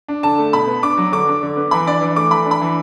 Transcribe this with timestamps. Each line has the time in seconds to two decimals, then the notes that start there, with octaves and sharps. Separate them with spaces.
0.08 D4
0.23 D3 A5
0.38 A3
0.53 B2 B5
0.67 B3
0.83 D4 D6
0.98 F#3
1.12 D3 D6
1.28 D4
1.43 D3
1.56 B3
1.71 E3 B5
1.86 D4 D5
2.01 E3
2.16 A3 D6
2.31 E3 B5
2.46 D4
2.51 B5
2.61 E3